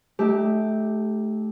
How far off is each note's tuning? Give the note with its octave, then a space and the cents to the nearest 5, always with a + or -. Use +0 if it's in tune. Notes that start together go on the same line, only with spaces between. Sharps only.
A3 -25 D#4 +0 G4 +0